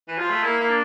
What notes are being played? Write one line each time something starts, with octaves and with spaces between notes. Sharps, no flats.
E3
F3 F4
A3
A#3 E4
A#3 E4
D4